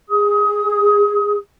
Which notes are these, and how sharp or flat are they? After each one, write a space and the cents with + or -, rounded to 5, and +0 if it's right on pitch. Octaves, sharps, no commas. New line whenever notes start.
G#4 -20 D#6 +25